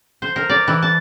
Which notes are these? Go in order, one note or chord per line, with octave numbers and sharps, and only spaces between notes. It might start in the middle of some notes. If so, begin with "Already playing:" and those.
C5
A#4
D5
E3
A5